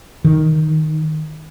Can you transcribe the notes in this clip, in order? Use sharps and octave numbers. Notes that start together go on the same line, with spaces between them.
D#3